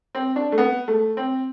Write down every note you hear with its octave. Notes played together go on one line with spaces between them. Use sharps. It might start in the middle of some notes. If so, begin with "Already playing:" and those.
C4
D4
A3
B3
A3
C4